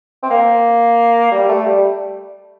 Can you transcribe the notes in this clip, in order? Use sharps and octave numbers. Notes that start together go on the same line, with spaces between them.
C4
A#3
G3
A3
G3